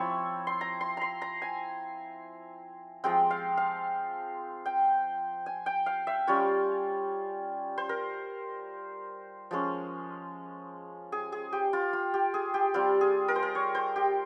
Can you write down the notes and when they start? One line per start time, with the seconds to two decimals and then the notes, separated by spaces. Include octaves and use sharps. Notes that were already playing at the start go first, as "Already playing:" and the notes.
Already playing: F3 C4 E4 C#5
0.47 C6
0.61 A#5
0.81 C6
0.97 A#5 C6
1.22 A#5
1.42 G#5
3.04 F3 G#3 C4 G5
3.31 F5
3.57 F5
4.66 G5
5.46 G#5
5.66 G5
5.86 F5
6.07 E5
6.27 G3 C#4 F4 C#5
7.78 C5
7.89 A#4
9.51 F3 G#3 C#4
11.12 G#4
11.32 G#4
11.53 G4
11.73 F4
11.93 F4
12.14 G4
12.34 G#4
12.54 G4
12.74 G3 C4 F4 G4
13.01 G#4
13.28 A#4
13.36 C5
13.43 A#4
13.55 C#5
13.75 C5
13.96 G4